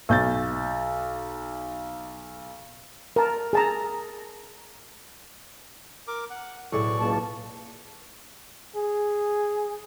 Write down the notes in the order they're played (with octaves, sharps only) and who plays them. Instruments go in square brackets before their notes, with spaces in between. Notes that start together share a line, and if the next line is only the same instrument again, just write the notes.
[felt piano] B1 G6 A6
[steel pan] A#4 A5
G#4 A5 A#5
[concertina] A#4 D6
F#5
[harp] B1 A2 [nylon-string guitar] E4 G#4 A4 [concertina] D5 C#6
[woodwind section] C#2 A#3 A5
[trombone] G#4